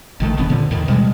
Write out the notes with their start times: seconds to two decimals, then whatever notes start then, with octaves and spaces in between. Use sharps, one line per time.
0.20 A1 D#3 A3
0.37 D#1 D2 B3 C#4
0.50 A#2 D3 F3
0.71 D#2 A2 D#3 E3
0.88 B2 G3 G#3